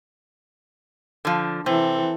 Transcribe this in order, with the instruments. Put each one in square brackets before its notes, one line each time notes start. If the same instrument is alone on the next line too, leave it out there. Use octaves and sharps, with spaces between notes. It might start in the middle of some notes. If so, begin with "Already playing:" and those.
[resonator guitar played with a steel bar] D3 F3
[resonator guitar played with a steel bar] C3 [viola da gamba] E3 A4 [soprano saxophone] C4